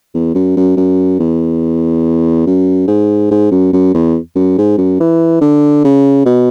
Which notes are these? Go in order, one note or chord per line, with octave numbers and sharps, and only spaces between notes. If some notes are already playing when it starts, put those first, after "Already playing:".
E2
F#2
F#2
F#2
E2
F#2
G#2
G#2
F#2
F#2
E2
F#2
G#2
F#2
E3
D3
C#3
B2